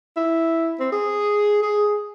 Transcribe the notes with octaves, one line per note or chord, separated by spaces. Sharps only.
E4
C4
G#4
G#4